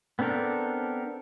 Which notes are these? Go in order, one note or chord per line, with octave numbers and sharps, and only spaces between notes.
B3 C4 D4 A4 A#4